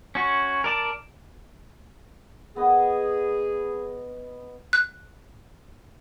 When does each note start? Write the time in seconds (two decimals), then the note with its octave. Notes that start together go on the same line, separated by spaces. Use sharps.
0.15 C#4 F#4
0.64 A#4 D5 A5
2.56 B3 G#4 D#5
4.73 F#6